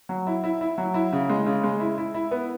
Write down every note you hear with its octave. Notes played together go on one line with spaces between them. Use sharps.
F#3
E4
E4
E4
F#3
E4
C#3
G#3
C#3
G#3
E4
E4
E4
B3